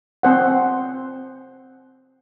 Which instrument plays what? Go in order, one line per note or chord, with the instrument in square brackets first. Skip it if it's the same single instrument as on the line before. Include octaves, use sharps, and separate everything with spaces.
[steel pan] C4 C5 F#5